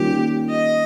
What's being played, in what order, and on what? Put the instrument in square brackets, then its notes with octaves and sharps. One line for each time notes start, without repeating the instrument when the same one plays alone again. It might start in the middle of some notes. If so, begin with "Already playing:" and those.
Already playing: [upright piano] D#3 G3 A#3 C#4 F4 [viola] G4
[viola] D#5